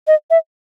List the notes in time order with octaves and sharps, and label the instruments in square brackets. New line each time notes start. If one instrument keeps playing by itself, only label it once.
[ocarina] D#5
E5